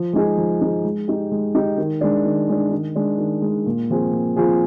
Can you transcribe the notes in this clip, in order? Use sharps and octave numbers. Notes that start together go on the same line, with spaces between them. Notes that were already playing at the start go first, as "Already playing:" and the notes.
Already playing: F3
G#3 D#4 G#4
F3
G#3 D#4 G#4
G#3
D#4 G4
G#3
D#4 G4
D#3
G#3 D4
D#3
G#3 D4
D#3
G#3 D4
D#3
G#3 D4
A#2
F3 C4 F4 G#4
A#2
F3 C4 F4 G#4